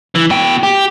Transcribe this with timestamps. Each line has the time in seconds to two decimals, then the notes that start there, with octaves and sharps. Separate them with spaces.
0.16 E3
0.31 B2 G5
0.63 G4